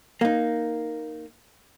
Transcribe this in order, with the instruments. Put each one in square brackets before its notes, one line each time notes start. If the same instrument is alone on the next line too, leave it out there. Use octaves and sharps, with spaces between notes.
[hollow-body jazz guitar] A#3 D#4